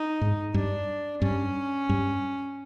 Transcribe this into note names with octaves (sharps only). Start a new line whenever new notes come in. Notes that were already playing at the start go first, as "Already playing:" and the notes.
Already playing: D#4
G#2
G2 D4
G2 C#4
G2